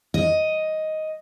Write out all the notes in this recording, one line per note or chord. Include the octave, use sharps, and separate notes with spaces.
D#5